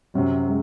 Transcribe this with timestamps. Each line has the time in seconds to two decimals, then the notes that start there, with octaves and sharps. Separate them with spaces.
0.14 F#2 C3 F#3
0.46 G#3